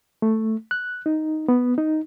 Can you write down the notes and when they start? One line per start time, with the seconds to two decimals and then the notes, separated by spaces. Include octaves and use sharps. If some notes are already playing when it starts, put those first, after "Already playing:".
0.22 A3
0.71 F#6
1.06 D#4
1.48 B3
1.78 D#4